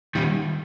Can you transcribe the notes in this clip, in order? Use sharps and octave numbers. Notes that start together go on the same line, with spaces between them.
D#3 G3